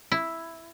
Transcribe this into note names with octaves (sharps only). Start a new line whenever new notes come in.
E4